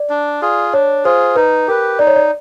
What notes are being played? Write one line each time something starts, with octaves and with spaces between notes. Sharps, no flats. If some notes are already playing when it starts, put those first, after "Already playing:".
Already playing: D5
D4
F4 G#4
D4 C#5
F4 G#4 C5
D#4 B4
G4 A#4 B4
D#4 D5
C#5
D5